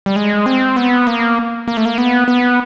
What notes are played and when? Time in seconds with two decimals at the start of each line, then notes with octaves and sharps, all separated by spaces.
0.06 G3
0.16 G#3
0.46 C4
0.76 B3
1.07 A#3
1.68 A#3
1.77 A3
1.85 A#3
1.98 B3
2.28 B3